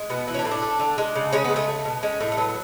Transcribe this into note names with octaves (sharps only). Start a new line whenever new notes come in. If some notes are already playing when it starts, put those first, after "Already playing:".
Already playing: G#3
B2 B3
E3 E4
C#4
D4
A2 E4
D4
A3
D3
G#3
C#3
G#3 C#4
B3
C#3
A3
A3
B2
G#3 C#4
A2 A3
A3
F#3 B3
B3